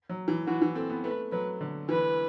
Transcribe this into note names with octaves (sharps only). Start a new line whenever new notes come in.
F#3
E3
E3 F#4
E3
C4 A4
B3
A3 B4
F#3 B4
D3
E3 B4